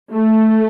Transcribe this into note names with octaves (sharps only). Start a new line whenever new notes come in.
A3